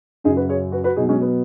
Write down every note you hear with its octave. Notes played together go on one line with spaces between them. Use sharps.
F#2 C#3 F#3 D#4 G#4
F#4 B4
G#4 C#5
F#4 B4
F#4 B4
B2 F#3 D#4 G#4
G#3 C#4
B3